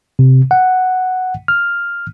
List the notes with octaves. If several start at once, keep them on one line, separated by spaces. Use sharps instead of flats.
C3
F#5
F6